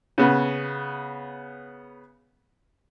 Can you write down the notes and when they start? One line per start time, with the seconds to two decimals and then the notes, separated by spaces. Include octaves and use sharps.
0.18 C#3 B3